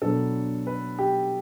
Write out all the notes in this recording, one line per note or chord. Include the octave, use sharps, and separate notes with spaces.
B2 F#3 B3 D4 A4
B4
G4